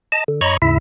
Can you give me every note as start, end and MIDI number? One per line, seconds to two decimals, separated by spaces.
0.12 0.24 75
0.12 0.24 81
0.28 0.41 50
0.41 0.57 42
0.41 0.57 73
0.41 0.57 75
0.41 0.57 82
0.41 0.57 83
0.41 0.57 85
0.62 0.78 39
0.62 0.78 44
0.62 0.78 49
0.62 0.78 64
0.62 0.78 76